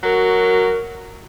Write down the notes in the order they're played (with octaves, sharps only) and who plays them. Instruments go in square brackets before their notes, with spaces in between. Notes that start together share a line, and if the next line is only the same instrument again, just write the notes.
[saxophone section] F#3 F#4 A#4